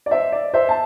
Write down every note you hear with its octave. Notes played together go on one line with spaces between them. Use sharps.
D5
C5 E5
D5
C5 E5
A5